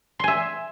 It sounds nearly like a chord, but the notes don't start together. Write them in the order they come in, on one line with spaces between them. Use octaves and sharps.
C6 G#5 E5